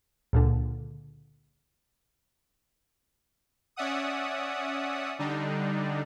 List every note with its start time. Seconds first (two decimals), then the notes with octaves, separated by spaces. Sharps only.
0.33 C#2 A#2 D3
3.76 C#4 D5 E5 F#5 D#6
5.19 D3 G3 D4 D#4